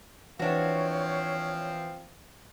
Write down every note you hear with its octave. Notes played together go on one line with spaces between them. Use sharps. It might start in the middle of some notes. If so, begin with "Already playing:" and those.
E3 F3 C4 D4 F#4 C#5 F5